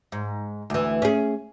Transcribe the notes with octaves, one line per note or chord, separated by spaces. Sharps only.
G#2
D2 E3
C#4 G#4